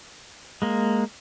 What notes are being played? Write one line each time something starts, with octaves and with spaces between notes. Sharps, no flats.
G#3 A#3